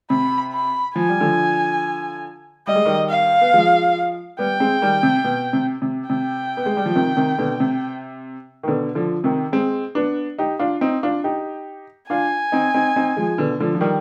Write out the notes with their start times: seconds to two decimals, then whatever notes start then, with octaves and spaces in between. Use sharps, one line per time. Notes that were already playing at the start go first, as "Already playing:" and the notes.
0.10 C3 B5
0.53 B5
0.96 F3 G#5
1.09 G3
1.21 D3 F3
2.67 G3 D#5
2.76 G#3
2.85 D#3 G3
3.10 F5
3.41 B3
3.53 F3 G#3
4.39 G3 B3 G5
4.60 G#3 C4
4.82 D#3 G3
5.03 C3
5.24 B2
5.53 C3
5.82 C3
6.10 C3 G5
6.57 B3
6.66 G#3
6.77 G3
6.86 F3
6.96 C3 D#3
7.17 C3 D#3
7.38 B2 D3
7.60 C3
8.63 D#3
8.68 B2 D3
8.95 D3 F3
9.24 C3 D#3
9.52 G#3 C4
9.95 B3 D4
10.38 D#4 G4
10.59 D4 F4
10.81 C4 D#4
11.03 D4 F4
11.24 D#4 G4
12.10 D4 F4 G#5
12.52 C4 D#4
12.74 C4 D#4
12.96 C4 D#4
13.17 F3 G#3
13.38 B2 D3
13.60 D3 F3
13.75 F3
13.81 D#3 G3